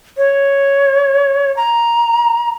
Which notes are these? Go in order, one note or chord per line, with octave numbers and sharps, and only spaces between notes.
C#5
A#5